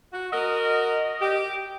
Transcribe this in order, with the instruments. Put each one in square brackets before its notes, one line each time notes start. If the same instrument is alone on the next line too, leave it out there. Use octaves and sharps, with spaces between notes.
[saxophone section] F#4
[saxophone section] F#4 A#4 [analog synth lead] D#5
[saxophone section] G4